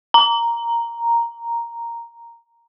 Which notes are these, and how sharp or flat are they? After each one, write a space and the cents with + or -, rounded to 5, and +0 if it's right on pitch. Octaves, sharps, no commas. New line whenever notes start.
A#5 +0